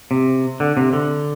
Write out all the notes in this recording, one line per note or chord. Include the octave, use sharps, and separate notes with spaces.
C3
D3
C3
D3